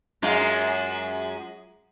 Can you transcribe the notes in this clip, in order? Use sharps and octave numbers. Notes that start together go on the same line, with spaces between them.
F#2 G#3 F4